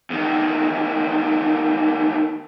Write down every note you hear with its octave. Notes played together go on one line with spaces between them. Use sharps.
E2 D#3